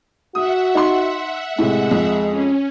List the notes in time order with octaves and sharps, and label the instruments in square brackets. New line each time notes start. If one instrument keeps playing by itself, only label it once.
[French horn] F#4 [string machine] E5 F#5 [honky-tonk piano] D#6
[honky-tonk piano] D#4 C6
[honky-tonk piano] A2 C3 [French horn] G#3
[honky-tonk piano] F2
[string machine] C#4